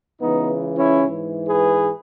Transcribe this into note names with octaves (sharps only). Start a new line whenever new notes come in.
C#2 C#3 E3 B3 D#4
C#4 E4
G#2 E3
G#4 B4